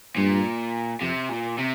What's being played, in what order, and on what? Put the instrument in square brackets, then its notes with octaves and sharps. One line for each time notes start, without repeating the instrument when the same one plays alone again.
[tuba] G2 [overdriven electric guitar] A#2
[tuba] F2 [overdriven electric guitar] C3
[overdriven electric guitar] A#2
C3